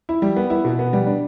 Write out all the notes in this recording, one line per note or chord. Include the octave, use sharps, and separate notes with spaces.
E4
G3
B3
E4
B2
B3
G3
D4